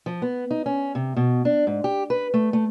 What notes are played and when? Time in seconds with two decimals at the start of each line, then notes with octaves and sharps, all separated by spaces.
0.06 F3
0.22 B3
0.51 D#4
0.66 C#4
0.95 C3
1.17 B2
1.45 D4
1.67 G#2
1.84 G4
2.10 B4
2.34 A3
2.53 A3